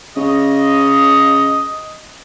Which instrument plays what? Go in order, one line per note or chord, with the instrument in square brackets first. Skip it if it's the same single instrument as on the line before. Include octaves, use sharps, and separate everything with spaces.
[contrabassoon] C#3 [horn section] D#5